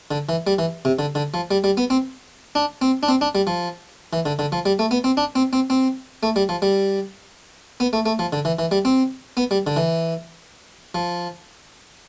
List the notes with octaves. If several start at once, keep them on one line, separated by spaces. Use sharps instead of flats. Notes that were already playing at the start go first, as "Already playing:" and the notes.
D3
E3
G3
E3
C3
D3
D3
F3
G3
G3
B3
C4
D4
C4
D4
C4
D4
G3
F3
E3
D3
D3
F3
G3
A3
B3
C4
D4
C4
C4
C4
A3
G3
F3
G3
B3
A3
A3
F3
D3
E3
E3
G3
C4
B3
G3
D3
E3
F3